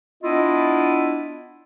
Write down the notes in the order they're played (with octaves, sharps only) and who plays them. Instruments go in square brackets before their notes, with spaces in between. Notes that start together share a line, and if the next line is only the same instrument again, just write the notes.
[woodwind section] B3 D4 E4 F4 D#5